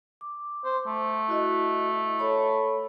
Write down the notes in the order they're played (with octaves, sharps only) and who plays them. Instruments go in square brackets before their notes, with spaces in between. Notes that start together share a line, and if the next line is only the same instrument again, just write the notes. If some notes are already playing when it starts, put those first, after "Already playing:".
[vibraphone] D6
[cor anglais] C5
A3
[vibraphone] E4 F#4 D#5
A4 C#5 B5